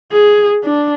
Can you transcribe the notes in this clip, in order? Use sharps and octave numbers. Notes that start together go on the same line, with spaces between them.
G#4
D4